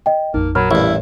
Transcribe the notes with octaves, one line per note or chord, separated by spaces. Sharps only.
D#5 G5
A1 F2 A#3 D#4
A#2 F#3 A#4 C#5 B5 F6
A1 G2 E4 C#5